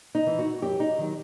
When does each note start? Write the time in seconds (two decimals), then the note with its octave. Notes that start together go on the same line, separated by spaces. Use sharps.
0.15 D#4
0.27 E3
0.39 F#4
0.62 F#2 G4
0.80 D#4
0.98 D#3 F#3